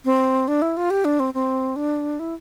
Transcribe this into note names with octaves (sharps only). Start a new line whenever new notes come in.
C4
D4
E4
F4
G4
D4
C4
C4
D4
E4